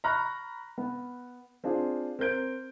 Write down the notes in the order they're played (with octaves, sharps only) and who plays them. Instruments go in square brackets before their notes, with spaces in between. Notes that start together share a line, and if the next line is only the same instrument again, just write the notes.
[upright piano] A#5 B5 C#6 F6 F#6 A#6
B3
C4 D4 F4 G#4
C4 A#4 G6 D7